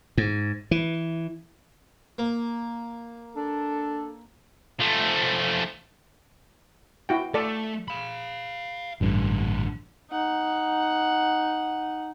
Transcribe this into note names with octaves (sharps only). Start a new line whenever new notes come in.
G#2
E3
A#3
D4 A4
F3 A3
E4 F#4 G5
A3 A4 D5
F5 B5
A1 G2 A#2 D3
D#4 F#5